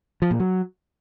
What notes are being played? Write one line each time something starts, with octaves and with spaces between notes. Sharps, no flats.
F3
A#2
F#3